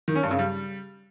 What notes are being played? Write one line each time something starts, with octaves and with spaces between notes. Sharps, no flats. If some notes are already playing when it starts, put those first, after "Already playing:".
D#3
C#4
G2
C#3
G3